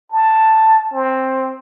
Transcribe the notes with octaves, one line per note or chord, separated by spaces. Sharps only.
A5
C4